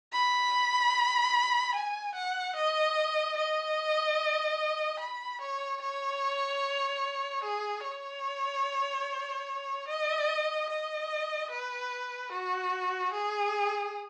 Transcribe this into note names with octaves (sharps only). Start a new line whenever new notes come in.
B5
G#5
F#5
D#5
D#5
B5
C#5
C#5
G#4
C#5
D#5
D#5
B4
F#4
G#4